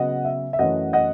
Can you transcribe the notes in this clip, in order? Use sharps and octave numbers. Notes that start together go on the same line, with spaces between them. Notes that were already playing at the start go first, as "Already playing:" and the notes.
Already playing: C#3 F#3 B3 D#5 F#5
E5
E5
F#2 E3 A3 C#4 D#5 F#5
D#5 F#5